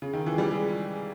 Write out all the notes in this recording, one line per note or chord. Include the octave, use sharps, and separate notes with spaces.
C#3
D#3
E3
G#3
G3
G#3